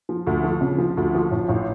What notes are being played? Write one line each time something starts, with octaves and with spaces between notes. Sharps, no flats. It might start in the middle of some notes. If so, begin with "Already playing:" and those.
F3
D2
F3
C#3
F3
D2
F3
A1
A1